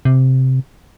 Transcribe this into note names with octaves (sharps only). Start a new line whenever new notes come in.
C3